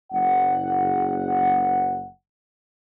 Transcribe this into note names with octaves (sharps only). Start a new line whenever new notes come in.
F#1 F#5